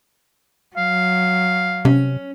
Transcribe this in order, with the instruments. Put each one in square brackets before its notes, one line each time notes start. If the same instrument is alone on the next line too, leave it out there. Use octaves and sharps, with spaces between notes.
[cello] F#3 [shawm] F5
[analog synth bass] C3 [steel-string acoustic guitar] C#4